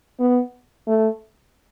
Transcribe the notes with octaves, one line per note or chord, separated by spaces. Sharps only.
B3
A3